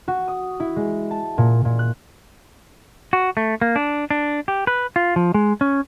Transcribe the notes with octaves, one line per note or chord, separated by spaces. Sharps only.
F#4
D#6
E4
G#3
A5
A#2
A#2
F#6
F#4
A3
A#3
D4
D4
G4
B4
F4
F3
G#3
C#4